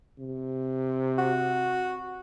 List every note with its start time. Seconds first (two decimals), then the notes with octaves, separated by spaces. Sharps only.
0.19 C3
1.18 F#4